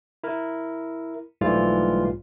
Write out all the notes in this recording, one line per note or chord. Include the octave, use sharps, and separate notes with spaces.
E4 A#4
B1 G#2 E3 G3 A3 F4